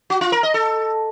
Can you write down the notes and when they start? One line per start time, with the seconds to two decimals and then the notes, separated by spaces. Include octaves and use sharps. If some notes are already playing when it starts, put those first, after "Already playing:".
0.10 F#4
0.21 F4
0.32 A#4
0.43 D#5
0.54 A4